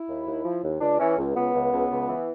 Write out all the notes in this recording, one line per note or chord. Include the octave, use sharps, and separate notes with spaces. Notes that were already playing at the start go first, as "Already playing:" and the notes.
Already playing: E4
D#2
D#2
F3
D#2
C#2 D4
E3 C#4
C#2
C#2 B3
C#2
C#2
C#2
E3